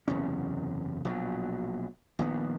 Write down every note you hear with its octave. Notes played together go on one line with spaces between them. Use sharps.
F#1 E2 C3 C#4
A#1 B2 F#3
A#1 D#3 B3